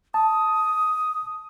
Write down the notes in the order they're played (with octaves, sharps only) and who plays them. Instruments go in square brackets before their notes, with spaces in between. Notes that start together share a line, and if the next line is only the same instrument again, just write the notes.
[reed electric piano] A5 [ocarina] D#6